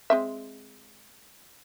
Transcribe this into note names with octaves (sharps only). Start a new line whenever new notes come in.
G#3 C4 E5